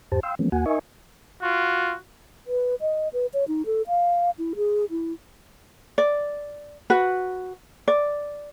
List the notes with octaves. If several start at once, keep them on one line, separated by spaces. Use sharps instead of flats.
E2 G#2 G4 C5 A5
F5 G5 C6 E6
E3 F3 G#3 A#3 B3 C#4
D#2 A#3 F#4 F#5 G#5
D#4 A#4 D#5 E5 G#5 C#6
F4 F#4
B4
D#5
B4
C#5
D#4
A4
F5
E4
G#4
E4
D5
F#4 B4
D5